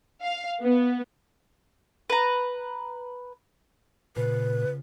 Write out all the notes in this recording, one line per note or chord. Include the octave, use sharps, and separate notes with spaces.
F5
B3
B4 A#5
A#2 C#3 F4 B4 C5